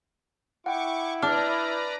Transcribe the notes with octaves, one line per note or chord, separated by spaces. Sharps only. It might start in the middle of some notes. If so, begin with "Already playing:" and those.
E4 F#5 G5 C#6 D6
D4 B4 D5 A#5 F6